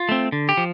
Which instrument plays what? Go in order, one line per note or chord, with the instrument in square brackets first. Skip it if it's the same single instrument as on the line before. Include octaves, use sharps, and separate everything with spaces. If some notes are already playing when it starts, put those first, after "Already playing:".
Already playing: [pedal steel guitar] F4
A3 C4
D3
G4
F3